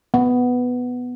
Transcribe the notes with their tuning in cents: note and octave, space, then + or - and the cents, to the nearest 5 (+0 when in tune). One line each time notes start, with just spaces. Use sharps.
B3 +5